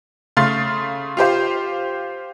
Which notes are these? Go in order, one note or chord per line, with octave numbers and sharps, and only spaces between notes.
C#3 A3 F5 C6 F6 A6
F4 G4 C5 F5